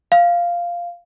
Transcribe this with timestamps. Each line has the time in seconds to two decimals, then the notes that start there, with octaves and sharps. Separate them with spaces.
0.12 F5